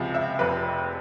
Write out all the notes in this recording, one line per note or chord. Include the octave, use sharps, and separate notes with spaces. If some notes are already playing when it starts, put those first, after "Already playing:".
Already playing: C#2 C3 F3
E5
F1 F2 C3 F3 B4